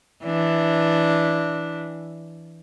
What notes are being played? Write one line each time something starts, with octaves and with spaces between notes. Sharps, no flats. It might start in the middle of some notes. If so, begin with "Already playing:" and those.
E3 D4